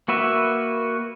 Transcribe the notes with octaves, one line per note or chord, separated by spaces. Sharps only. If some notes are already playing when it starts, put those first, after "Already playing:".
A#3 F#4 B4 E5